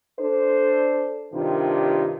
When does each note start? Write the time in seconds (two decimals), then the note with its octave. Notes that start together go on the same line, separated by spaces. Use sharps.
0.19 D4 A4 C5
1.32 G2 C3 D#3 D4 F4 G4